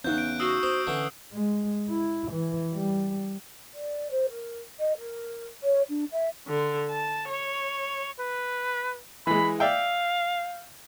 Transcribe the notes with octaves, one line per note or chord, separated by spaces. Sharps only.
E2 C#3 B3 D#4 F#6 G6
D7
F#4 D#6 E6 C7
C5 D#6 G7
D3 E3 C#4
G#3
E4
E3
G3
D5
C5
A#4
D#5
A#4
C#5
D4
E5
D3
A5
C#5
B4
E3 G#3 B5
D5 E5 F5 G5